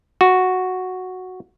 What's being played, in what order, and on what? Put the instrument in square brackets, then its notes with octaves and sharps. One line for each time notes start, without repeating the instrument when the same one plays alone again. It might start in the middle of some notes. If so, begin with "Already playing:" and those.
[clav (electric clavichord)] F#4